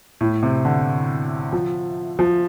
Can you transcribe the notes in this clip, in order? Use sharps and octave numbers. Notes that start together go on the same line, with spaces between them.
A2
C3
D3
F3
F3